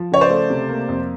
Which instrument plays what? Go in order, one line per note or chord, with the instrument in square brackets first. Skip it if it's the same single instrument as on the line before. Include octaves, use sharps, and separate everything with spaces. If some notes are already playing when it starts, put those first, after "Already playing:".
Already playing: [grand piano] F3
C#3 C#5
C5 D5
A3
C3
A#3
F2